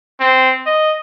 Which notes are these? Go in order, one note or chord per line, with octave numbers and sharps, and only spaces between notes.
C4
D#5